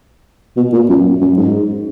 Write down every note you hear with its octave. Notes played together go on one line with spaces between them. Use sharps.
B2
A#2
F#2
F#2
G#2